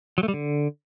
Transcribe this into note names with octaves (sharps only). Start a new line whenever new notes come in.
F#3
A3
G3
D3